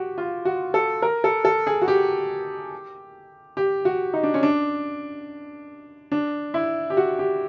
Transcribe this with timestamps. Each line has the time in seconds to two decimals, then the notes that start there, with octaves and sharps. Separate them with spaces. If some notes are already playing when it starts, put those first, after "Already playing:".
Already playing: F#4 G4
0.18 F4
0.45 F#4
0.74 A4
1.02 A#4
1.24 A4
1.45 A4
1.67 G#4
1.82 F#4
1.88 G4
3.57 G4
3.85 F#4
4.14 D#4
4.23 D4
4.34 C#4
4.43 D4
6.12 D4
6.54 E4
6.90 G4
6.97 F#4
7.19 G4